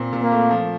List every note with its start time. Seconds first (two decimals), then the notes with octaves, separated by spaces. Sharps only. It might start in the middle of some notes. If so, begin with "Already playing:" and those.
Already playing: A#2 C4
0.13 A#2
0.22 A#3
0.32 A3
0.51 F3